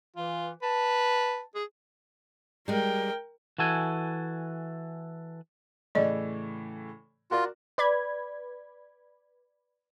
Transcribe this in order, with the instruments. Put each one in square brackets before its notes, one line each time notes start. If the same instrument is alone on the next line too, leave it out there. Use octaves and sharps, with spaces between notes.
[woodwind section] E3 [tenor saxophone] F4
[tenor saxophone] B4 [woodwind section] A5
[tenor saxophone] G#4
[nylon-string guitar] G3 G#3 [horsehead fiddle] A#4 G5
[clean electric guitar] E3 F#4 A4 G#5
[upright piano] A2 C#3 E3 [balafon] D5 D#5
[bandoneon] F4 [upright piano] F#4 A#4 D5
[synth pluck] B4 D5 B5 G#6